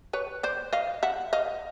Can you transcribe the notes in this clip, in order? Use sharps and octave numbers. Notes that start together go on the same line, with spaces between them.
B4 C#5
C5 D5
D#5 F5
E5 F#5
D#5 F5